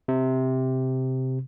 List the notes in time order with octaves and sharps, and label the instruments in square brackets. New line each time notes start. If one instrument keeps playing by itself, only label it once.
[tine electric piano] C3